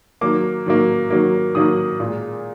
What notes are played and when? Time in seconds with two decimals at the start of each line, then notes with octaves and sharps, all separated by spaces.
0.21 D#3 F#3 A#3 D6
0.66 D#3 F#3 A#3
1.10 D#3 F#3 A#3
1.55 D#3 F#3 A#3 D#6
2.00 A#2 G#3